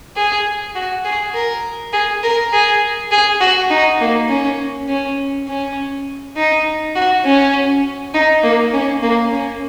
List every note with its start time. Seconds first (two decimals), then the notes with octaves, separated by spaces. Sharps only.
0.16 G#4
0.75 F#4
1.05 G#4
1.34 A#4
1.93 G#4
2.23 A#4
2.52 G#4
3.11 G#4
3.40 F#4
3.70 D#4
4.01 A#3
4.29 C#4
4.89 C#4
5.48 C#4
6.37 D#4
6.95 F#4
7.25 C#4
8.14 D#4
8.44 A#3
8.73 C#4
9.03 A#3
9.32 C#4